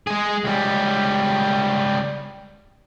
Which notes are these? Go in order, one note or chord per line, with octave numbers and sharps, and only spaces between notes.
G#3 G#4
C#2 G3